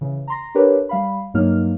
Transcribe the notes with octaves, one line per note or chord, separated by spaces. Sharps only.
C#3 E3
A#5 C6 A#6
D4 G4 A#4 B4 C#5
G3 F5 B5
G2 F#3 A#3 D#4 F6